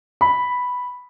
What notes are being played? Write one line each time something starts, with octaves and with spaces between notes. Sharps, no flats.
B5